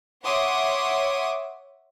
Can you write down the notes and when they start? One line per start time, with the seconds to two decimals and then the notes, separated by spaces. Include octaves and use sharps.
0.24 C#5 E5 F#5 C6 D6 D#6